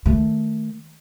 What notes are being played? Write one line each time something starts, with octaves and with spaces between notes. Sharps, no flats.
D#3 A3